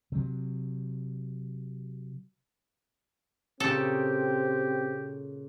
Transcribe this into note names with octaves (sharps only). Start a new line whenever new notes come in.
C3 F#3
A#2 C#3 C4 G4 A4